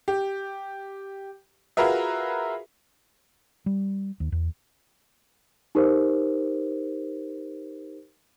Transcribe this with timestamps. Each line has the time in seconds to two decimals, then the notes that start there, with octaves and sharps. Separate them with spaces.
0.08 G4
1.77 F4 F#4 G#4 A#4 B4 E5
3.66 G3
4.20 D#2
4.32 E2
5.75 D#4 G4 A#4 C5